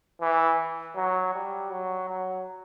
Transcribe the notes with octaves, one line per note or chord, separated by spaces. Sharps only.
E3
F#3
G3
F#3
F#3